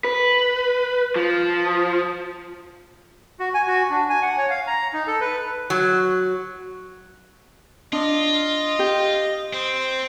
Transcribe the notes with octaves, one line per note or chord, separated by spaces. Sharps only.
B4
F3
F#4
G#5
F#4
D4
G#5
F#5
C#5
F5
A#5
D#4
A4
B4
F#3
D4 F4 D#5
G4
C4 C5